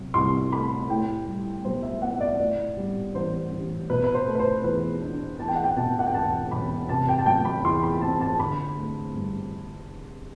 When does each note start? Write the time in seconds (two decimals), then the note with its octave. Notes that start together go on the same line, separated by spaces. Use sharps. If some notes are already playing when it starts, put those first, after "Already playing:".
Already playing: C3 F#3
0.14 C2 C6
0.51 A3 B5
0.89 A2 G5
1.27 G3
1.65 B1 C5
1.83 E5
2.02 B3 F#5
2.14 E5
2.20 D5
2.40 A2 D5
2.77 G3
3.14 A1 C5
3.52 A1
3.90 B2 B4
4.04 B4
4.14 C5
4.27 A3
4.35 B4
4.39 C5
4.64 E2 B4
5.02 D4
5.39 E2 A5
5.48 G5
5.55 F#5
5.64 G5
5.76 B2 A5
5.99 F#5
6.07 G5
6.14 E1 A5
6.51 E1 B5
6.89 C3 A5
7.09 G5
7.18 A5
7.26 F#3 G5
7.45 B5
7.64 E2 C6
7.83 B5
8.01 C4 A5
8.21 A5
8.39 D3 B5
8.76 A3
9.14 G2